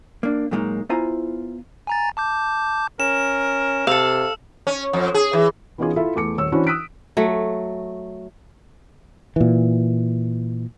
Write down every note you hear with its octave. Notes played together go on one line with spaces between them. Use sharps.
A#3 D4
A#2 F#3 G#3 A#3 D#4
B3 E4 F4 C5 G#5 A#5
G#5 A#5 A6
A5 D6 G6
C#4 A#4 E7
C3 A4 F5 E6
C#4
F2
G#4
E3
E3 B3 C#4 D#4 F4 G#4
E4 F4 A4 E5
E2 A3 D6 C#7
D#1 C#5 E6
E3 C#4 D4 E4 F#4 C5
D#6 E6 F#6 B6 D7
F#3 A3
A#2 E3